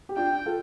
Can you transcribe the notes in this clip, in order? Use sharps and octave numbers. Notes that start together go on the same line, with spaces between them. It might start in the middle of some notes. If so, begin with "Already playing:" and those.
G4
D4 F4 G5
F4 A4